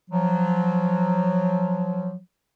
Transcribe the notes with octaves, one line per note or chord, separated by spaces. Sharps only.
F3 F#3